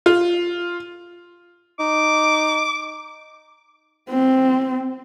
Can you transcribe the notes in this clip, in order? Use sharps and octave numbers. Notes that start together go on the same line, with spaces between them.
F4
D#4 D6
C4